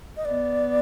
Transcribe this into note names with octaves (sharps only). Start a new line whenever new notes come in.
D#5
B3 D5